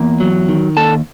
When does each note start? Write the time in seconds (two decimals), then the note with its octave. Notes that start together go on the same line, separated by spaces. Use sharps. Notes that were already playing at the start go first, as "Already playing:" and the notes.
Already playing: E2 A#3
0.20 F#3
0.48 D#3
0.77 D#2 A4 A5